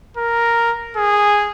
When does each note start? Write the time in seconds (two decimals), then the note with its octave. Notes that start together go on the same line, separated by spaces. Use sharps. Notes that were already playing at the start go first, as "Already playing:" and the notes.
0.17 A#4
0.97 G#4